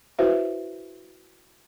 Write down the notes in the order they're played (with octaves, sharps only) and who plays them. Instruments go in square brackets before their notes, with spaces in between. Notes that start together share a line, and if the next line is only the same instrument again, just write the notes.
[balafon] E4 F#4 B4 C5 E5 F5